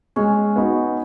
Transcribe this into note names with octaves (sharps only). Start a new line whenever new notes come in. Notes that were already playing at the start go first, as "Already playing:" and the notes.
G#3 C#4
B3 D#4 F#4